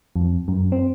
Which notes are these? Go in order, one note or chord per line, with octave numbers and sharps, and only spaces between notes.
F2
F#2
C4